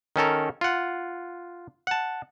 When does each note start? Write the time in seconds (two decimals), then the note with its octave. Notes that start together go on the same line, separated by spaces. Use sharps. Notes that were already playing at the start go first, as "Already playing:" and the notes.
0.16 D#3 C#4 A4 A#4
0.61 F4 F#5
1.87 F#5 A5